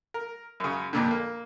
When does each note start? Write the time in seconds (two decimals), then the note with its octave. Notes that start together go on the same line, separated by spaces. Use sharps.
0.14 A#4
0.60 F#2 C#3
0.93 F2 A#2 D3
1.11 A#3